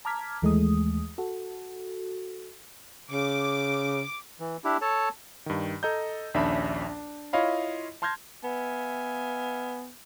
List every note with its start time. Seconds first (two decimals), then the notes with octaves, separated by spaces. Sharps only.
0.05 A5 A#5 D6 F6 G#6 B6
0.42 D#2 E3 G#3 A3 G#4 D#6
1.18 F#4 A4
3.11 C#3 D6
4.40 E3
4.64 D4 E4 G4
4.81 A4 C#5 A5
5.46 G2 D#3
5.83 A4 D#5 A#5 G6
6.34 A#1 D#2 C#4 D4 E5 B5
6.87 D4
7.33 E4 F4 C#5 D#5 F5 B5
8.02 A5 C6 F6 G6 G#6 A#6
8.44 B3 E5 F5 G#5